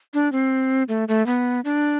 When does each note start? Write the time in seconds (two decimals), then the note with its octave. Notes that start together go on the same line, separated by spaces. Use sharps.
0.14 D4
0.32 C4
0.89 A3
1.08 A3
1.26 B3
1.65 D4